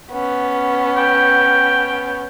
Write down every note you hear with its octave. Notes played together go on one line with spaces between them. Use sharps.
B3 C#4
G5